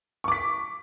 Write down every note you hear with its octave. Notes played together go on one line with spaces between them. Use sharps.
C#6 D6 B6